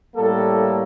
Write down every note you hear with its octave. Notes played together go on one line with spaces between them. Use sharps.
A2 G3 A#3 A4